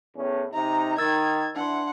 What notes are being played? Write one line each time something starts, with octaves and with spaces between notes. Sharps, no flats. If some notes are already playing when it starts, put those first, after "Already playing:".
E2 A2 C#4
C3 D#4 A#5
D#3 E6 G#6 A6
E3 D4 F#5 C6